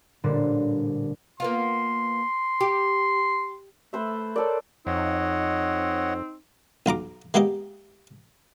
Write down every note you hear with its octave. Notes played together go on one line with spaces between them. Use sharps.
A1 A#2 D3 G3 C5 D5
A#3 B3 F4 C6
G4
A3 B4 C5 E5
A4 A#4 C#5 D5
F2 C4 D#4 C#5 D#5 F#5
B1 F4 A#5 D6
G#3 A#3 B3 G4 D#5